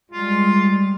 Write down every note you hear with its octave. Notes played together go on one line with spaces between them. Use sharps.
G3 G#3 F4